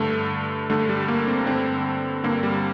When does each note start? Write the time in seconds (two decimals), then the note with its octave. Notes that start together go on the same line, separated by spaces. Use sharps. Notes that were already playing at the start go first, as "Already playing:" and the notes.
Already playing: G2 D3 A3
0.69 G2 D3 A3
0.89 G3
1.08 A#3
1.27 C4
1.46 G2 D3 C4
2.24 G2 D3 A#3
2.43 G3